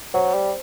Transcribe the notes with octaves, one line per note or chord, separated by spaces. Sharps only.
F#3 C5
G3